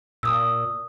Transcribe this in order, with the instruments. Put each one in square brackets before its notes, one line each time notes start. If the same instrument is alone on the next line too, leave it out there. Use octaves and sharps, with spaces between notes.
[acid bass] A#2 [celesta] D#6 E6